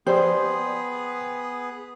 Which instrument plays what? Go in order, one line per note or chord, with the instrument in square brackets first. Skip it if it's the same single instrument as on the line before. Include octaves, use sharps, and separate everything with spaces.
[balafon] F3 G4 D5 [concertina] B3 G#4 [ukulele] C5 [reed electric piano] G5 C6